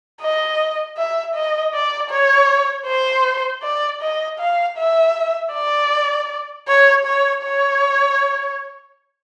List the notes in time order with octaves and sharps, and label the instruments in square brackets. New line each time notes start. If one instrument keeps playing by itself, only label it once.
[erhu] D#5
E5
D#5
D5
C#5
C5
D5
D#5
F5
E5
D5
C#5
C#5
C#5